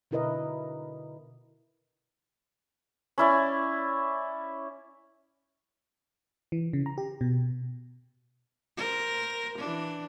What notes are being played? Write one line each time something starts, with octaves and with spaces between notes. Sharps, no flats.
B2 D3 E4 A#4 B4 D#5
C#4 E4 D5
E3
C#3
A#5
G4
B2
A#4 C5
E3 D4